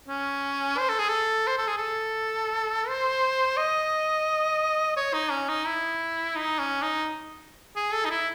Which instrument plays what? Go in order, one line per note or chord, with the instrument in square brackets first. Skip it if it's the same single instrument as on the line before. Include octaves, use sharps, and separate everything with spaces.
[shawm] C#4
C5
A4
G#4
A4
C5
A4
G#4
A4
C5
D#5
C#5
D#4
C#4
D#4
E4
D#4
C#4
D#4
G#4
A4
D#4
E4